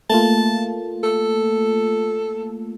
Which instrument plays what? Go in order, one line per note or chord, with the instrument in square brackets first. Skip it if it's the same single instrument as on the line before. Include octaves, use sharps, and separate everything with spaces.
[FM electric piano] A3 A#3 F4 [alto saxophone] A5
[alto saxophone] A4